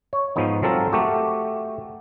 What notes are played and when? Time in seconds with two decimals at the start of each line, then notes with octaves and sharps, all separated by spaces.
0.13 C#5
0.36 G#2 F3 G#3 B3 D#4
0.62 F#3 C4 A4 A#4 F5
0.93 A3 F#4 G4